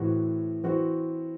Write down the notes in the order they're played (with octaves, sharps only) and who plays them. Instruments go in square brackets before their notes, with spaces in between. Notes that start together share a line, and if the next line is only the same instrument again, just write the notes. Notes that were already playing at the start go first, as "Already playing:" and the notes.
Already playing: [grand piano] A2 E3 C4 F#4
E3 C4 F#4